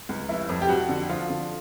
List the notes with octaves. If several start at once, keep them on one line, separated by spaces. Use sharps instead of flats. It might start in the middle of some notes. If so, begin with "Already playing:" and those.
C#2
F1 E4
F2
G4
F2 F#4
D3
F3 F4
D3